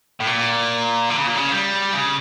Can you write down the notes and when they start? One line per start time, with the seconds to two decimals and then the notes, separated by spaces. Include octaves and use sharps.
0.20 A2
0.27 A#2
1.10 D3
1.18 C#3
1.27 A#2
1.36 C#3
1.51 G3
1.93 C#3